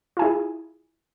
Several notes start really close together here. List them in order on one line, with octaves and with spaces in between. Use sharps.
F4 G#5 E4 G#4